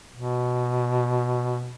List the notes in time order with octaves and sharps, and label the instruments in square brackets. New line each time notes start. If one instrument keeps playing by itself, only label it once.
[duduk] B2